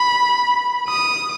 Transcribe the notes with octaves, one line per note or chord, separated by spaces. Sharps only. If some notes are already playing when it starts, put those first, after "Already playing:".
Already playing: B5
D#6